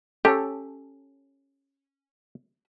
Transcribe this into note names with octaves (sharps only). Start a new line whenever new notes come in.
C#4 G4 A4 C#5